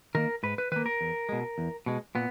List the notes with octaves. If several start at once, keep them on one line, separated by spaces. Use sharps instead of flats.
D#3 A#3 A#4
G#2 B4
B4
D#3 A#3 B4
A#4
E2
B2 G#3
E2
B2 G#3
A#2 B3